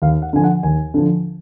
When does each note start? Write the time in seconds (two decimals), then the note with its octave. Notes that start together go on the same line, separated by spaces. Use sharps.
0.02 D#2 F5
0.22 F#5
0.33 D3 F3 G#5
0.44 F#5
0.63 D#2 G#5
0.94 D3 F3